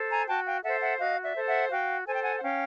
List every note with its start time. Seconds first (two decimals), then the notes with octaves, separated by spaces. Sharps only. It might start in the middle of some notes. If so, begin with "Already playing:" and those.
Already playing: A4 C5
0.10 G#5 A#5
0.28 F#4 G5 A5
0.45 F5 G5
0.63 A4 C5 E5 F#5
0.82 E5 F#5
0.99 F#4 D#5 F5
1.23 D5 E5
1.36 A4 C5
1.47 E5 F#5
1.71 F#4 F5 G5
2.07 A4 C5 G#5
2.15 G5
2.22 F#5 G#5
2.36 F#5
2.43 C#4 F5 G5